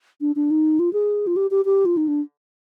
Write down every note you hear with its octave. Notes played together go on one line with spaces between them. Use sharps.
D4
D4
D#4
F4
G#4
F4
G4
G4
G4
F4
D#4
D4